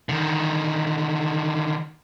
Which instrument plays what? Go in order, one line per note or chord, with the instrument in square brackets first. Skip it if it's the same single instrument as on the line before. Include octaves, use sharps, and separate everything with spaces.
[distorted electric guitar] D3 D#3